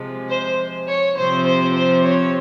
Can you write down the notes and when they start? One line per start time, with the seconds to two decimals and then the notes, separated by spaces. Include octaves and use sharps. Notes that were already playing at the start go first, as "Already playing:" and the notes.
Already playing: C3 F3 G#3
0.29 C5
0.88 C#5
1.18 C3 F3 C4 C5
1.47 C5
1.76 C5
2.06 C#5